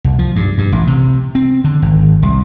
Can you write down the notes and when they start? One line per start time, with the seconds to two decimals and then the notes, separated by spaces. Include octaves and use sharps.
0.04 C2
0.19 F3
0.36 G2
0.58 G2
0.72 A1
0.87 C3
1.35 C4
1.64 D3
1.82 G#1
2.23 C2